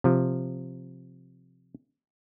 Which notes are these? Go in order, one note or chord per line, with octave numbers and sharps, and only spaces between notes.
C3 F3